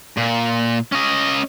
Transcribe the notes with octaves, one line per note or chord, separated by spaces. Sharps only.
A#2
C#4 D#5